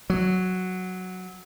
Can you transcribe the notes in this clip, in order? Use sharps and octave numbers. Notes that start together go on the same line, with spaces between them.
F#3